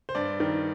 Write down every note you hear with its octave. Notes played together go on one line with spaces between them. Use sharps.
C5
G2 D5
D#3